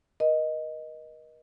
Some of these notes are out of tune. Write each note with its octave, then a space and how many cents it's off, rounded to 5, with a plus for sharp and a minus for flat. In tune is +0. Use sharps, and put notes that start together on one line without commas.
A#4 +45 D#5 +0